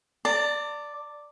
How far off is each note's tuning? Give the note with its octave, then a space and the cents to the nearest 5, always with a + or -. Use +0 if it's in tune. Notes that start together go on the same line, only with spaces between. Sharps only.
D5 +0 A5 +45